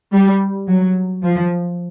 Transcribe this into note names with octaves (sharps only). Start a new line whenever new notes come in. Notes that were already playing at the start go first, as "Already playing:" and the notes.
G3
F#3
F3